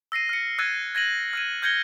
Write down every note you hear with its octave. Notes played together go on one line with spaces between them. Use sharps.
E6 A#6 C7 D#7
F6 C#7
E6 F#6 G#6 A6 C#7 D#7
G#6 A#6 D#7 F#7
F6 G#6 D#7
F6 G6 G#6 A#6 C#7 G7